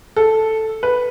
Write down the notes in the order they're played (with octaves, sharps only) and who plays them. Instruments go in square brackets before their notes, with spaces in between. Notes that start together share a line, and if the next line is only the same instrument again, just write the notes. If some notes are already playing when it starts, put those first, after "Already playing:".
[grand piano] A4
B4